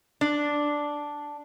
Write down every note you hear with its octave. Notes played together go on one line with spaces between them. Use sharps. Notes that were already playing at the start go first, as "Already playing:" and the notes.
D4